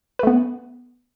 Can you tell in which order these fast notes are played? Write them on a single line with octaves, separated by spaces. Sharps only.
B4 A3 B3